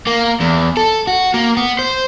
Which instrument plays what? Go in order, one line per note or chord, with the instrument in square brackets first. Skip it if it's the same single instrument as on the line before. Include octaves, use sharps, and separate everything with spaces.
[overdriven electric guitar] A#3
E2
A4
F#4
A#3
B3
C5